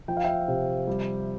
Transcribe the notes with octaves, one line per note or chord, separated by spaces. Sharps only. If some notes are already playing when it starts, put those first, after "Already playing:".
F3 G5
F5
E5 G5
C3
G3